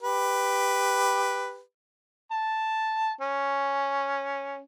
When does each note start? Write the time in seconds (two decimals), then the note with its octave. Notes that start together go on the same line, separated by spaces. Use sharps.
0.01 G4 B4
2.31 A5
3.21 C#4